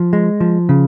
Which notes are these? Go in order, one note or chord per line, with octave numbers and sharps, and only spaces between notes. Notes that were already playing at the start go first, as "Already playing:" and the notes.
Already playing: F3
G#3
F3
C#3